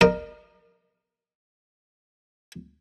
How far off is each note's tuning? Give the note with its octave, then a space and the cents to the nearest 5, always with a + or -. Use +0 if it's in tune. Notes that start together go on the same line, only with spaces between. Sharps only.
A#4 +5 D#5 -45